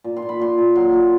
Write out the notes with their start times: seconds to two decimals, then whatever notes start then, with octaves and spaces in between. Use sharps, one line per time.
0.04 A#2
0.17 C6
0.22 A#2
0.29 B5
0.40 A#2 C6
0.58 A#2
0.75 F#3 C6
0.93 A#2